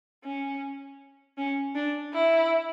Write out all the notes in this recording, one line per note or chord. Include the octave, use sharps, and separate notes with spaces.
C#4
C#4
D4
E4